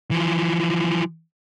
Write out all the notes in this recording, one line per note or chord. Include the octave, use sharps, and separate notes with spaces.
E3 F3